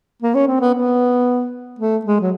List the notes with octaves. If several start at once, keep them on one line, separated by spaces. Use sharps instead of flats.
A#3
C#4
C4
B3
B3
A3
G#3
F#3